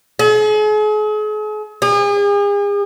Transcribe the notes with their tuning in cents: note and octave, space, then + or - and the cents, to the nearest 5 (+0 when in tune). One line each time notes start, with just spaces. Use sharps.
G#4 +40
G#4 -40